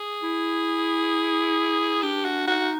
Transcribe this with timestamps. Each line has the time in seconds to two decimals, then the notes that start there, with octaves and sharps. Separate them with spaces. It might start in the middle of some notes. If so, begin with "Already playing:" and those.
Already playing: G#4
0.23 E4
2.02 D4 G4
2.25 F#4
2.47 D#4 F#4